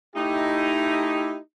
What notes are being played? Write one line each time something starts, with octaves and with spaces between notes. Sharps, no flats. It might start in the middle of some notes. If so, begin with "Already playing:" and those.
A3 D#4 E4 G4